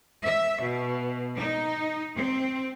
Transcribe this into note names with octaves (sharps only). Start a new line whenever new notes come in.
E5
B2
D#4
C4